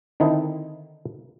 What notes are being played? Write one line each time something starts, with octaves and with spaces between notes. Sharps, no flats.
D3 D#3 C4 D#4 E4 A4